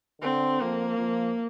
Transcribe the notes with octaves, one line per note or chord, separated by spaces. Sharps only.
D3 C4
F3 A#3
F3